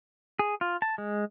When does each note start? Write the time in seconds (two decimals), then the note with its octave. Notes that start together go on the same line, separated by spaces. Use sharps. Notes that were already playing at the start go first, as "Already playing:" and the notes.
0.39 G#4
0.61 F4
0.82 A5
0.98 G#3